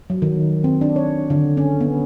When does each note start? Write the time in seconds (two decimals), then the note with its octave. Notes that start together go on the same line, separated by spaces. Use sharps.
0.10 F#3
0.22 D#3
0.64 C4
0.81 D4
0.96 C#5
1.30 D3
1.57 C#4
1.81 B3